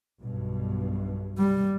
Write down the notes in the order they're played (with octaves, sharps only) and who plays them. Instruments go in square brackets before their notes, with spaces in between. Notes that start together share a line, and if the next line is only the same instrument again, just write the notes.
[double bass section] B1 G2 B2
[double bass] G3